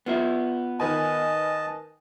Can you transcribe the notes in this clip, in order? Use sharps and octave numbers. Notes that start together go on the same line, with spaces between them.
B3 F4 E5
D#3 B4 D#5 G#5 A5